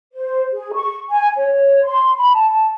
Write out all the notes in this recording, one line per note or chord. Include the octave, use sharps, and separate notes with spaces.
C5
G#4
C#6
G#5
C#5
C6
B5
A5